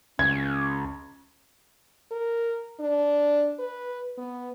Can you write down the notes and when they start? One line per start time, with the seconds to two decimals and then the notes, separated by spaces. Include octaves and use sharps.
0.19 C#2 C#4 G#6
2.11 A#4
2.80 D4
3.59 B4
4.18 B3